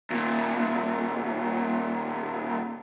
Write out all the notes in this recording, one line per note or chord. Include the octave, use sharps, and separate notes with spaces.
D#2 A#2